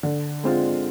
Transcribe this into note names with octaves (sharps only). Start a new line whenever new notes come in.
D3
G#3 C4 F4